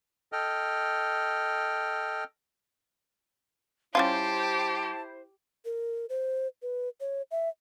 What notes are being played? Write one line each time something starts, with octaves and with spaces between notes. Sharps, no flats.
A4 D#5 G5 F6
G3 C#4 E4 F4 G4 C5 A5
A#4
C5
B4
C#5
E5